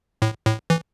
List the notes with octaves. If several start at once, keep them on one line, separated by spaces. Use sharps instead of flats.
A2
A2
E3